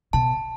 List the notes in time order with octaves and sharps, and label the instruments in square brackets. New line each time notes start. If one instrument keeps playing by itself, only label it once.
[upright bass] B2 [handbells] A5